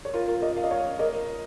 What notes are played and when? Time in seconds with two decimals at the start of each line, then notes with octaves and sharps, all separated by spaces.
0.05 C#5
0.14 F4 A#4
0.28 F4 A#4
0.42 A#4 D#5
0.57 F5
0.64 D#5
0.71 C#5 F5
0.99 A#4 D#5